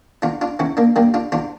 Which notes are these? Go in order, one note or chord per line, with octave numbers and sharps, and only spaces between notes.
E2 D4 F4
D4 F4
E2 C#4 E4
A#3 D4
G3 A#3 D4
D4 F4
E2 D4 F4